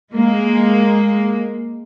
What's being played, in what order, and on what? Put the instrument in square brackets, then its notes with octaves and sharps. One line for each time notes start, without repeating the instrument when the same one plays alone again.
[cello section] G#3 A#3